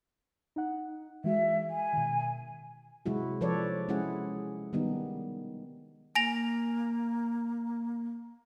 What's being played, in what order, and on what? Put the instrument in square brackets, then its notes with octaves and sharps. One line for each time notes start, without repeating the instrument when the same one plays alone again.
[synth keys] D#4 F#5
[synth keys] E3 G#3 F#4 [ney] E5
[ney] G#5
[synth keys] B2 D#3
[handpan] C3 F#3 G#3 E4 F#4
F3 A4 B4 C#5 D5
G#3 C#4 E4 G#4 F#5
D#3 G3 B3 D#4
[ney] A#3 [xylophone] G#5 A#6 F7